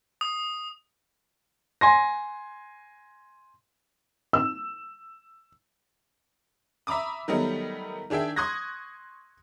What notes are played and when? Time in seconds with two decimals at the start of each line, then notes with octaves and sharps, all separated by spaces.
0.21 D#6
1.81 G#5 C6 A#6
4.33 E6
6.87 E5 A#5 B5 D6 D#6
7.28 D#3 F#3 G3 A3 B3 D#4
8.10 D#3 D4 G#4 E5 G5
8.36 C6 C#6 D#6 F#6 G#6 A#6